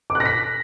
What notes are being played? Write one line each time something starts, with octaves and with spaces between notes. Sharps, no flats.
D6
F#6
A#6
B6